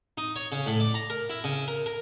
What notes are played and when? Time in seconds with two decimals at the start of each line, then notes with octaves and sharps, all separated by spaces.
0.18 D#4
0.36 C#5
0.52 C#3
0.66 A2
0.80 D5
0.94 A#5
1.10 A#4
1.30 E4
1.44 C#3
1.68 A#4
1.86 A#4